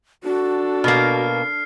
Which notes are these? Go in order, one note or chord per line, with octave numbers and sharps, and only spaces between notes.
D4 F#4 A4
B2 A#3 F6 C7